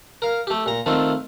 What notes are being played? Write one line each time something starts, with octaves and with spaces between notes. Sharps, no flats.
A#4 F5
A3 G4
A#2 A#5
D#3 A3 C4 F4